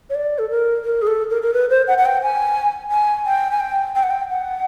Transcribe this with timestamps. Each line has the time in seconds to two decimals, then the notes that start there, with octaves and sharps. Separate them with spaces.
0.10 C#5
0.15 D5
0.39 A4
0.50 A#4
0.84 A#4
1.02 G#4
1.07 A4
1.30 A#4
1.42 A#4
1.54 B4
1.70 C5
1.88 F#5
1.98 F#5
2.06 G5
2.22 G#5
2.91 G#5
3.26 G5
3.51 G#5
3.60 G5
3.96 G5
4.03 F#5
4.11 G5
4.30 F#5